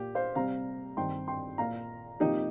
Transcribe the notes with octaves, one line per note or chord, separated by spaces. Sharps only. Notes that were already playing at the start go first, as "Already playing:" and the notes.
Already playing: A#2 A#3 G4
C5 F5
C3 G3 C4 F5 A#5
G2 D#3 C4 G5 C6
G5 C6
A#2 A#3 F5 A#5
C3 F3 A#3 D#4 G4